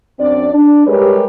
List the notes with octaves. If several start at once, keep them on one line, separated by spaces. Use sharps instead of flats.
F#2 C4 D4 D5
D4
G3 G#3 G4 A#4 B4 C#5